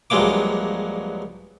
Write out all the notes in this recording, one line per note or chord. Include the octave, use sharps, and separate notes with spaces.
A#1 G2 F#3 G#3 A#3 D6